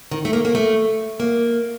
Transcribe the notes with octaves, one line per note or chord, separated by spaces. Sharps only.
D#3
A3
A#3
A#3
A3
A#3